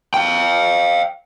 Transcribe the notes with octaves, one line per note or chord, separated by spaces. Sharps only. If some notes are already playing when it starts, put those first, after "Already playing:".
F5 G5